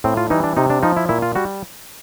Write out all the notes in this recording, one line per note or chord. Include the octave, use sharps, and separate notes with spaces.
A2 C4
F4
E3 G3 D#4
D4
C3 D#4
D4
F3 D#4
E4
A#2 E4
F4
G3 F#4